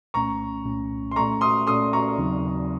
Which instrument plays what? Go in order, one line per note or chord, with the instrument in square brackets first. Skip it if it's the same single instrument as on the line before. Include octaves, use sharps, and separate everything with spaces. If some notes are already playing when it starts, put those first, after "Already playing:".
[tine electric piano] C2 A#2 A3 C#4 [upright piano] A#5 C#6
[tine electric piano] C2 A#2 A3 C#4
[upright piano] C6
[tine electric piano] A#2 A3 C#4 A4 [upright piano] A#5 C#6
[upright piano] C6 D#6
[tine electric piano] A#2 A3 C#4 A4 [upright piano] C6 D#6
[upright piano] A#5 C#6
[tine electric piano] D#2 C#3 F#3 C4 D#4